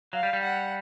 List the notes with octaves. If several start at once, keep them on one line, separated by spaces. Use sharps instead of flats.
F#3 F5
G3
G3
F#5